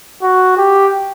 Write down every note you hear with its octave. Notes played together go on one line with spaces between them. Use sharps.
F#4
G4